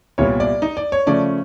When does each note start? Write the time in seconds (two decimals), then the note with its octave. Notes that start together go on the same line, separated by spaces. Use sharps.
0.18 C2 A#2 G3 B3 C#5
0.40 D5
0.62 D#4 D#5
0.77 D5
0.92 C#5
1.07 C#3 F3 A3 C#4 D5